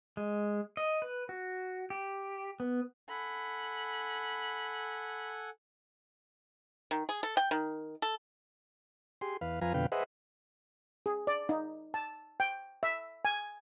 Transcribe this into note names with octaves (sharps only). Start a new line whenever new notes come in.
G#3
D#5
B4
F#4
G4
B3
A4 F#5 G#5 B5
D#3
G#4
A4
G5
D#3
A4
G4 G#4 C6
E2 B4 F5
F2 F3 B4 F5 G#5 A#5
F2 B2 D3 B4 F5 G5
G#4 B4 C5 D#5 E5 F#5
G#4
D5
D#4
A5
G5
E5
G#5